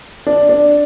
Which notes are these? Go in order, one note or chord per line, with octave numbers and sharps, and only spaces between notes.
D4
D4